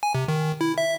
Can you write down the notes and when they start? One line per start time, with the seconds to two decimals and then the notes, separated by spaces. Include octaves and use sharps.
0.03 G#5
0.15 C3
0.28 D#3
0.61 E4
0.78 E5